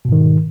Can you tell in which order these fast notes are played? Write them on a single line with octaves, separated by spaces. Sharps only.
B2 G#2 D#3